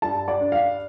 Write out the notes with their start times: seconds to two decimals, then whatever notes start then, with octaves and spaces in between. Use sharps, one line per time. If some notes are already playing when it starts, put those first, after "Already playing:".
0.02 G2 A5
0.28 D5
0.40 D4
0.52 F5